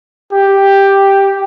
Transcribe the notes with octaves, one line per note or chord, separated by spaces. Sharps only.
G4